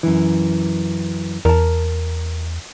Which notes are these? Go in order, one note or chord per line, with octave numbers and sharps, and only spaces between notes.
F#2 E3
E2 A#4 A5